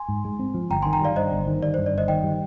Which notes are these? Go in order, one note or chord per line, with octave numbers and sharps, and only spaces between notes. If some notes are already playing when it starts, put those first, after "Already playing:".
Already playing: G#5 C6
G#2
G#3
C4
F3
G1 G5 A#5
D#3 G#5 C6
G5 A#5
G3 D5 F5
G2 C5 D#5
G1
D#3
G3 D5
G2 C5
D5
G1 C5 D#5
D#3 D#5 G5
G3